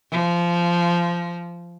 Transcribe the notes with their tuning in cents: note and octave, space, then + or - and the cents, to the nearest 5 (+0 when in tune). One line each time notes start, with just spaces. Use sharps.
F3 -15